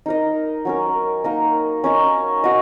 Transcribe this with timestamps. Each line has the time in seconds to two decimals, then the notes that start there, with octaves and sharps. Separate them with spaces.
0.06 D#4 A#4 D#5
0.65 F#3 C#4 A#4
1.24 A#3 D#4 A#4 D#5
1.84 C#4 A#4 D#5
2.44 F#4 D#5